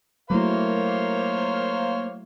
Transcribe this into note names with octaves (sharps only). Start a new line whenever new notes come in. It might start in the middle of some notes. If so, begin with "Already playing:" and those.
F#3 A3 A#3 E4 C5 C#5 F5